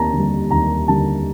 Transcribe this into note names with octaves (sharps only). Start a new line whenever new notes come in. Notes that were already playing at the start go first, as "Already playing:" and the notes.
Already playing: D#2 A5 A#5
D3 G3
D#2 A#5
D3 G3 A5